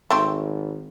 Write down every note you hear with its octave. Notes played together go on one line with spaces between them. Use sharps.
G#1 A3 C4